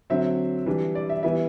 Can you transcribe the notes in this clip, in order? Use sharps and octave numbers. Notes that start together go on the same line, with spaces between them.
D3 F#3 C4 E5
E3 G3 D4
D5
E5
E3 G3 B3 E5